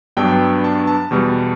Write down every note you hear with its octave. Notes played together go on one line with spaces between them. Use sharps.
G2 F#3 B3 D4 G5
A5
A5
E2 B2 G3